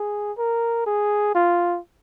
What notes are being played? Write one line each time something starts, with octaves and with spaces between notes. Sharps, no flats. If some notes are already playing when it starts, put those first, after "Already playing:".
Already playing: G#4
A#4
G#4
F4